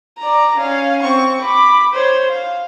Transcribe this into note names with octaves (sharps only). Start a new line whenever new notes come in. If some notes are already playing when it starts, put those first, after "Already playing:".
D5 A#5
C#4 F5
C4 C#6
B5 D6
C5 C#5
F5